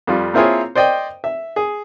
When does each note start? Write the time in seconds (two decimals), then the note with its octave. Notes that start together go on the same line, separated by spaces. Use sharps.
0.07 F2 G3 F4
0.34 A#3 C4 E4 F4 G#4 C#5
0.75 C5 D5 D#5 G5
1.24 E5
1.56 G#4